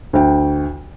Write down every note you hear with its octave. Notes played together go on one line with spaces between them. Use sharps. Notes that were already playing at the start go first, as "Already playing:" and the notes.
D2 G5